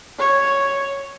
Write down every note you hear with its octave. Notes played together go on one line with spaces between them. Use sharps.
C#5